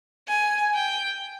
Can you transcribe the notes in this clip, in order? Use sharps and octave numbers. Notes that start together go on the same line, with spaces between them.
G#5
G5